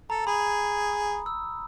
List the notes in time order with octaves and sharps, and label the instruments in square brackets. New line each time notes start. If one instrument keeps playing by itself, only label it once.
[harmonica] A4 [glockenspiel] A#5
[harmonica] G#4 [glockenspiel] B5
[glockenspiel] D#6
E6